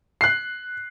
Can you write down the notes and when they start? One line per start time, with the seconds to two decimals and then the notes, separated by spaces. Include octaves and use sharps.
0.21 F#6 C7